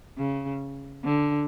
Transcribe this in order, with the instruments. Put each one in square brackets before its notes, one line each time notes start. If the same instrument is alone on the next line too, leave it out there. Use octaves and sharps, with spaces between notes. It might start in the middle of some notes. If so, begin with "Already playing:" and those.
[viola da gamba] C#3
D3